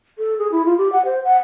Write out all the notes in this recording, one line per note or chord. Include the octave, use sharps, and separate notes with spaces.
A4
G#4
E4
F4
G4
F#5
C5
F#5